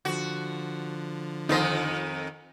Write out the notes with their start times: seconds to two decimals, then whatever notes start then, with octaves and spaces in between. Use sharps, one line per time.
0.05 D3 F3 F#4
1.49 F2 D#3 D#4 A4 C5 D#5